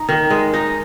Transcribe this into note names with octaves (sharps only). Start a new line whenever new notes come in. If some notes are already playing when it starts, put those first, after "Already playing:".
Already playing: D#4
D#3
G#3
D#4